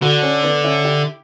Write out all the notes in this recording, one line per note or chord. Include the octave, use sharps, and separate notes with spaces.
D3 F#4 A4
C#4
B3 D4
C#4 E4
E4 G4